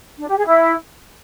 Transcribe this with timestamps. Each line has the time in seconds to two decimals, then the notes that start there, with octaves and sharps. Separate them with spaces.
0.19 D4
0.28 G4
0.37 G#4
0.46 E4